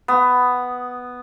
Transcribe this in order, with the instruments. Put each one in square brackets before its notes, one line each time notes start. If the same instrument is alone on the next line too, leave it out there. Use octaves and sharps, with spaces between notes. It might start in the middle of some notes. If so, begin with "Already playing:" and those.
[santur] B3